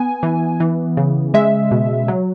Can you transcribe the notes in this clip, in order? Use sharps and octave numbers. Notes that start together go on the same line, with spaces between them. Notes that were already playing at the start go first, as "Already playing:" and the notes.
Already playing: B3 G#5
E3
E3
C#3
G#3 E5
B2
F#3